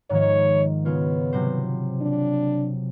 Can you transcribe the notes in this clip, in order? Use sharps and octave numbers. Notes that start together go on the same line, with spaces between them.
G#2 D#3 F3 C#5
C#3 B3 F4 C#5
C3 F#3 C5
D4